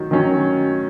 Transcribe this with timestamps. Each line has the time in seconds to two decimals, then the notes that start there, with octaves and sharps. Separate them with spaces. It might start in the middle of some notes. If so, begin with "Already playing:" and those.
Already playing: D#3 F#3
0.11 D#3 F#3 C#4